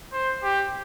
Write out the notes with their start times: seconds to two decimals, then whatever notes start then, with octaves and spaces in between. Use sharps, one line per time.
0.13 C5
0.43 G4